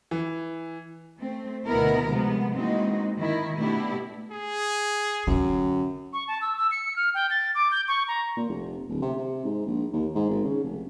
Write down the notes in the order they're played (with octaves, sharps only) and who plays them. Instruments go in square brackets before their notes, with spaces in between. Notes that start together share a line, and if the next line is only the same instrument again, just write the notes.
[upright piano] E3
[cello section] A3 C4
D2 B2 D#3 B3 E4 A#4
C3 F3 G#3 B3
E3 G#3 A#3 C4 D#4 F#4
D#3 E4
B2 A3 B3 D4 E4 G4
[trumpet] G#4
[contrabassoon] F#2 [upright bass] D3 C4
[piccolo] C#6
A5
E6
E6
C#7
F6
G5
A6
D6
G6
C#6
A#5
[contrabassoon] A#2
F1
D1
C3
C3
G#2
A#1
D#2
G#2
G#1
C#3
F1